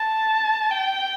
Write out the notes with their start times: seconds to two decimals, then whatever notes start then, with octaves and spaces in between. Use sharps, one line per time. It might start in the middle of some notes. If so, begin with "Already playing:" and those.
Already playing: A5
0.71 G5